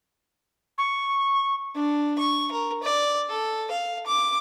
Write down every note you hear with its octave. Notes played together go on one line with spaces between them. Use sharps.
C#6
D4
C#6
A#4
D5
A4
F5
D6